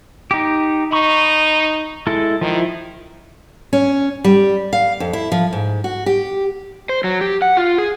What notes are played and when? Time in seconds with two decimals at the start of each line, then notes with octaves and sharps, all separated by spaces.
0.31 D#4 G4
0.92 D#4 B5 C#6
2.07 G#3 E4 A4
2.41 D#3 F3 E4
3.73 C#4
4.24 G3
4.73 F5
5.00 F2
5.13 E4
5.32 F3
5.53 G#2
5.84 F#4
6.06 G4
6.89 C5
7.04 F#3
7.21 G4
7.42 F#5
7.57 F4
7.78 G#4